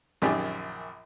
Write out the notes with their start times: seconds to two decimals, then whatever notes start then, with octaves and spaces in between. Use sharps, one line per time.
0.22 A#1 F#2 D#3 G4 G#4 D5